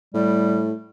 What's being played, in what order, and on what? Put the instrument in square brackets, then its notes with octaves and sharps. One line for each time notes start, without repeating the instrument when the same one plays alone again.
[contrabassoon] A2 [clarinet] G3